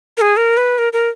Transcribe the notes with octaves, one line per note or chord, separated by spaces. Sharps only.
A#4
G#4
A#4
B4
A#4
A#4